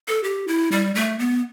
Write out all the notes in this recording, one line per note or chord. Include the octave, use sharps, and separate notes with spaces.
A4
G4
E4
G3
A3
B3